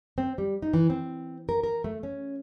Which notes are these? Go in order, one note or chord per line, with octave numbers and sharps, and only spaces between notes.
C4
G3
D#4
E3
C4
A#4
A#4
A3
C#4